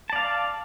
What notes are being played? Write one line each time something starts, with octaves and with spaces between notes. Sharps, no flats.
D5 F5 A5